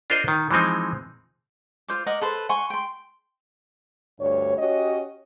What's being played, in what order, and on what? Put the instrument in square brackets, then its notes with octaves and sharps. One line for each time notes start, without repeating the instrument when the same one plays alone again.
[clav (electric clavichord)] D4 F4 A#4 C5 D#5
D#3
E3 F3 G#3 C4 D#4
[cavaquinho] F4 C5 D6
A#4 D#5 F#5 D6
A4 B4 C5
F#5 G#5 C6 C#6
G5 C6
[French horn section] D2 G2 C#5
C#4 F#4 G4 C#5 D#5